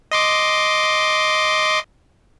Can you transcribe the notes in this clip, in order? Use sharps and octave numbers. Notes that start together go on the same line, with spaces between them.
D#5 C6 D6